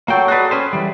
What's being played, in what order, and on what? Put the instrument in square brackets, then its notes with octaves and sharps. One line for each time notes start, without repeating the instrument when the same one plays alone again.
[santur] F#3 A3 C#6 [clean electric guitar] A#3 G5
[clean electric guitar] F#4 B4 [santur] G#4 A4 D5
[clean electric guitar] C#4 B4 C5
E3 G3